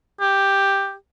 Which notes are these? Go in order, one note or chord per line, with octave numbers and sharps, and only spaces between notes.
G4